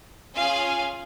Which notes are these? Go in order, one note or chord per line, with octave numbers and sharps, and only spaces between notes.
C#4 F4 G#4 F5 G#5